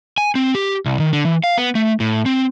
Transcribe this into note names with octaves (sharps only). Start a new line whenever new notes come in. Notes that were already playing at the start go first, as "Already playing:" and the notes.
G#5
C4
G4
C2
D#3
D3
E3
F5
B3
A3
A2
C4